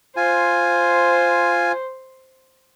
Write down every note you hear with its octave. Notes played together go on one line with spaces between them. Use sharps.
F4 C5 G#5